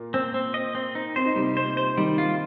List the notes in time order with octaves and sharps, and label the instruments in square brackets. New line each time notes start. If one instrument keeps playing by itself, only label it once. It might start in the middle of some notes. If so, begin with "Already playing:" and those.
Already playing: [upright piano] A#2 A#3
[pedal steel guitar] C4
C4
D#5
C4
D#4
[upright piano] C4 [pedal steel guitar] C5
[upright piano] D#4
[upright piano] C3 C4 [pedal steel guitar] G3
[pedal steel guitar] C5
C5
[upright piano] D#3 D#4 [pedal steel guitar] G3
[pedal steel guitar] F4